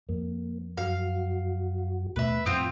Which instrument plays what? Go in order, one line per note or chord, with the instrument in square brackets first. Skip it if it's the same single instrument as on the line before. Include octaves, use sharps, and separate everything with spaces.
[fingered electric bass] F2 [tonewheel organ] A#3
[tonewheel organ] F#2 F#4 [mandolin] F5
[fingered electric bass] D#2 B2 A3 [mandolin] B4 E5
[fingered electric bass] F2 A2 [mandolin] B3 C4 F4